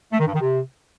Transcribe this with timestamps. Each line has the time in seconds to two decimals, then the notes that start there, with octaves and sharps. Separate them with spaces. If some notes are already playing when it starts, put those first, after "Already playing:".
0.12 A3
0.19 D#3
0.26 G2
0.34 D#3
0.41 C3